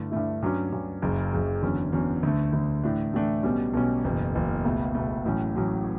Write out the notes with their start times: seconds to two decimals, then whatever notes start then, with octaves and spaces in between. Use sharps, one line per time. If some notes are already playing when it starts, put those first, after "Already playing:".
Already playing: G2 D3 A3 E4
0.11 G2 D3 A3 E4
0.42 G2 F#3 C#4
0.72 G2 F#3 C#4
1.02 F#1 F#2 C#3
1.33 F#1 F#2 C#3
1.62 E2 D3 F#3 C#4
1.93 E2 D3 F#3 C#4
2.23 D2 D3 A3
2.53 D2 D3 A3
2.83 A2 E3 A3 D4
3.14 A2 E3 A3 D4
3.43 B1 B2 G3 C#4
3.73 B1 B2 G3 C#4
4.04 F#1 E2 B2
4.34 F#1 E2 B2
4.65 C#2 B2 A3
4.95 C#2 B2 A3
5.25 A1 A2 F#3 C#4
5.56 A1 A2 F#3 C#4